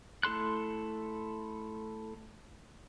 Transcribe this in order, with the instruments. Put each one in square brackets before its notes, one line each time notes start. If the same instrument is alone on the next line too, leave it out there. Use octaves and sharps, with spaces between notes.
[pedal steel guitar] A3 E4 A4 C6 F#6